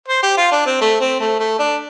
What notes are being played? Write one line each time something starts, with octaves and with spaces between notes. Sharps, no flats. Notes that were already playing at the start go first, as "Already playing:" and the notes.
C5
G4
F4
D4
C4
A3
C4
A3
A3
D4